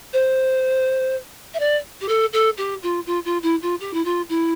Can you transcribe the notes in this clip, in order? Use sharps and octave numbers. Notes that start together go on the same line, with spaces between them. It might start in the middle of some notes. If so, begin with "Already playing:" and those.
C5
E5
D5
G4
A4
A4
G4
F4
F4
F4
E4
F4
G4
E4
F4
E4